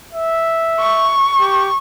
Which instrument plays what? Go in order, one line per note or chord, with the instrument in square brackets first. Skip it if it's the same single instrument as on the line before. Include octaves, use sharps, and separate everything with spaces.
[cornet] E5
[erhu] C#6
[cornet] G4